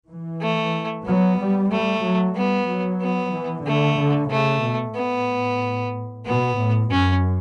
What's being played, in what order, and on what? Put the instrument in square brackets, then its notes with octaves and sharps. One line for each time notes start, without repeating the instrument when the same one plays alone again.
[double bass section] E3
[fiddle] A3
[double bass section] F#3 [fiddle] B3
[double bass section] G3
[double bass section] G3 [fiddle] A3
[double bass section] F#3
[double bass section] G3 [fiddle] B3
[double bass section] F#3
[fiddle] B3
[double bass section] E3
[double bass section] D3 [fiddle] A3
[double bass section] D3
[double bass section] C#3 [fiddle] A3
[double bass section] B2
[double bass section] A2 [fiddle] B3
[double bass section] B2 [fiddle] B3
[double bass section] A2
[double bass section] F#2 [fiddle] C#4